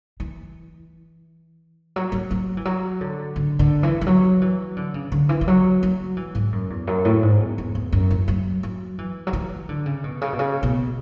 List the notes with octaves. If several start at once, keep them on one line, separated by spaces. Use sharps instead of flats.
E3
F#3
F#3
F#3
E3
F#3
D3
D3
D3
E3
E3
F#3
E3
D3
C#3
D3
E3
E3
F#3
F#3
E3
G#2
F#2
E2
F#2
A2
G#2
E2
E2
E2
F#2
E3
F#3
F#3
E3
F#3
E3
D3
C#3
B2
C#3
B2
C#3
B2